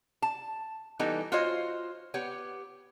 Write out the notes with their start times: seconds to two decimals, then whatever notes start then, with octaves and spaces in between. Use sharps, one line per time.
0.22 A5
0.99 E3 G3 B3 D#4 G4 A4
1.32 F4 F#4 C5 C#5 D#5
2.14 B3 G4 C#5